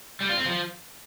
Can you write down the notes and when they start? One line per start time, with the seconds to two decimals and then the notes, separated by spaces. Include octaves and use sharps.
0.21 G3
0.29 F4
0.37 C4
0.46 F3